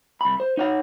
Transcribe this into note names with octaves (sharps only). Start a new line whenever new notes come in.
C2 B5
C5
D#4 C#5 F#5